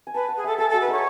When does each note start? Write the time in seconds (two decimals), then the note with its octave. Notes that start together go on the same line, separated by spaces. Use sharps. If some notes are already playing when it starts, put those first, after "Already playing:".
0.07 G#5
0.14 B4 A5
0.28 F#5
0.37 G#4
0.44 A4 E5
0.58 G#4 A4
0.69 A4
0.73 F#4
0.81 B4
0.88 D#4 C#5